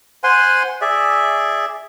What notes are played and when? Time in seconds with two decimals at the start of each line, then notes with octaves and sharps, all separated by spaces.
0.24 C5 F#5 G#5 C6
0.81 G#4 D5 E5